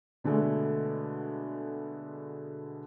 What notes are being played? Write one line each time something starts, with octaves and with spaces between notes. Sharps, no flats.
B2 D3 G#3 A3